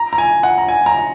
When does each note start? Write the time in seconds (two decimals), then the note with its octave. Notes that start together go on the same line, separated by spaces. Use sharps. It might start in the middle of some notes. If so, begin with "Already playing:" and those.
Already playing: A#5
0.13 A#5
0.18 G#5
0.43 F#5
0.58 A#5
0.68 G#5
0.86 A#5